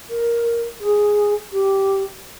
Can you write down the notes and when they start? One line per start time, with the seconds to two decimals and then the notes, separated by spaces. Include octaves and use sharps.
0.10 A#4
0.81 G#4
1.52 G4